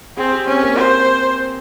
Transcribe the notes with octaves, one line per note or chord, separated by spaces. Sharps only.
C4 G#4
G4
C4 C#4
A#3
C5